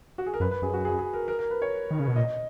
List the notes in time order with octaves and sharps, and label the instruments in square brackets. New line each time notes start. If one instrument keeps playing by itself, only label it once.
[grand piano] F#4
G#4
A#4
[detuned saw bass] F#2 [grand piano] B4
[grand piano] B4
[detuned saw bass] F#2 [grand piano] G#4
[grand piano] F#4
G#4
G#4
A#4
A#4
A#4
B4
C#5
[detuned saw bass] D#3
C#3
B2
[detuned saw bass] A#2 [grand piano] D#5